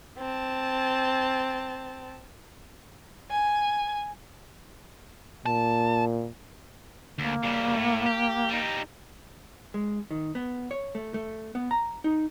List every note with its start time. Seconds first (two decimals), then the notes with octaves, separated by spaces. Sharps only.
0.18 C4 A5
3.30 G#5
5.46 A#2 A5
7.19 D2 A#3
7.43 C#3 G3
7.75 A2
8.06 G4
8.49 G3 D#4
9.74 G#3
10.11 D#3
10.35 B3
10.71 C#5
10.95 A3
11.14 A3
11.55 B3
11.71 A#5
12.04 D#4